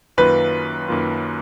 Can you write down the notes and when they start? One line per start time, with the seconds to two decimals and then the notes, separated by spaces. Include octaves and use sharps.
0.18 F#2 D#3 A#3 F4 B4
0.88 F#2 D#3 A#3 F4